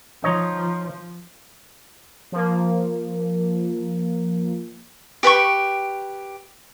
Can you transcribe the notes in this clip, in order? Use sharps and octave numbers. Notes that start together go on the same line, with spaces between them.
F3 D#4 C#5 D#5
F3 A#3
G4 B4 G5 C#6